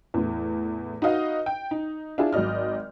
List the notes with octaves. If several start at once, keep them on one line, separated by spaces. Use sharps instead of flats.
E2 A2
D#4 F#4 B4 D#5 F5
G5
D#4
D4 E4 F4 G#4
G#1 F#3 D5 D#5 F6